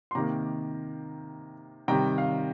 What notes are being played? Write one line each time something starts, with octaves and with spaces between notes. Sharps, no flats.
C6
C3 D#3 A#3 A#5 D6
C3 D#3 G3 G5 A#5
F5